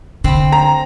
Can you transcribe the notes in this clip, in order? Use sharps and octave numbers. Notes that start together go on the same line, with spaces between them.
D3 C4 B5
A#5